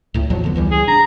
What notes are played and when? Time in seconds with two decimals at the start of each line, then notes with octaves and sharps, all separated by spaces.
0.14 C#2 A2
0.30 E2 F3 F#3
0.44 D3 B3
0.55 C#2 E3 G3
0.71 G#4
0.88 D4 A#5